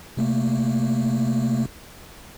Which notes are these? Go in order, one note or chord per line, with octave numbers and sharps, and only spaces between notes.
C3 A3 A#3